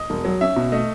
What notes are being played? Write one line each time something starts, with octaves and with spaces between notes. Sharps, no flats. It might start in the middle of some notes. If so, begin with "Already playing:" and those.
Already playing: D#5
E1
F#3
C#4 E5
B2
A3 D#5